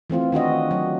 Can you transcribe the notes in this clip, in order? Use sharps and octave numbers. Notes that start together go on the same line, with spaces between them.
E3 A3 C4 F4
D#3 D4 F#4 D#5
F#3